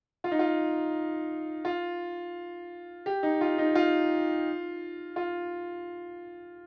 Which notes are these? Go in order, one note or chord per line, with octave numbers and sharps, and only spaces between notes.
F4
D#4
F4
F4
G4
D#4
F4
D#4
F4
F4